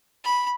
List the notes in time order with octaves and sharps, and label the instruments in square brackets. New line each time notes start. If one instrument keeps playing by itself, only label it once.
[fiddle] B5